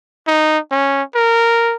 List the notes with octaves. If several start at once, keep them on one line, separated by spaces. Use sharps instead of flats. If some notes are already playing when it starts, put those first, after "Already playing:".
D#4
C#4
A#4